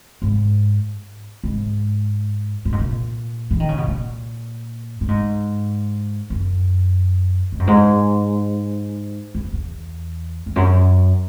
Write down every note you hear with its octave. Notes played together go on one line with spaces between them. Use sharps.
G#2
G#2
A#2
G#2
A#2
E3
D#3
C#3
B2
A#2
A#2
G#2
F#2
G#2
F#2
G#2
E2
E2
E2
F#2